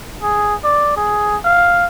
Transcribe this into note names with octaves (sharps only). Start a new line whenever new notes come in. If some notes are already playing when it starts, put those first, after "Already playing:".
G#4
D5
G#4
F5